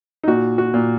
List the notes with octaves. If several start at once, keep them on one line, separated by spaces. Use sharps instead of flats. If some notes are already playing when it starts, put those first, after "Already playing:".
D#4
A#2 F#4
F#4
A#2